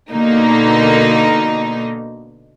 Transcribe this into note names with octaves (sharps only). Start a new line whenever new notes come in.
B2 D3 A#3 D#4